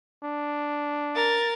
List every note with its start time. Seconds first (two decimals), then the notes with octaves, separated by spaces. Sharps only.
0.24 D4
1.14 A#4 A6